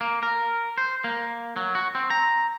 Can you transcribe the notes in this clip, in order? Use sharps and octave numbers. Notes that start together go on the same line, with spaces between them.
A#3
A#4
C5
A#3
F#3
F#4
C4
A#5